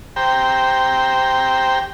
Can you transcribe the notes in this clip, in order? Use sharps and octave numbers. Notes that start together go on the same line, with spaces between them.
G4 C5 G5 A#5